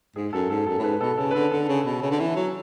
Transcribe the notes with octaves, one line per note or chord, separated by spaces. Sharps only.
G#2 G#4
F#2 A4
G#2 A4
F#2 A4
A2
G#2 B4
B2 A4
C#3 A4
B4
D3 A4
D3 A4
C#3
B2
C#3
D3
E3
F#3